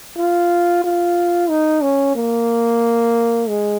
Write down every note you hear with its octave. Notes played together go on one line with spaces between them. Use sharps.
F4
F4
D#4
C#4
A#3
G#3